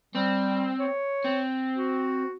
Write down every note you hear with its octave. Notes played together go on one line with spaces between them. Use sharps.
G3 C4
C#5
C4
F#4